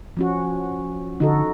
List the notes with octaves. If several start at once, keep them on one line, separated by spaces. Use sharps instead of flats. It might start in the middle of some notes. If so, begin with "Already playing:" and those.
F3 C#4 F#4
D3 D#4 F#4 A4